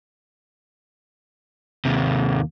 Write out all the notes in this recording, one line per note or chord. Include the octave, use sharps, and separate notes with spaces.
D#2 C3